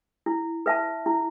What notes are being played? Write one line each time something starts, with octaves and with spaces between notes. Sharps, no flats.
E4
B4 E5 A5
E4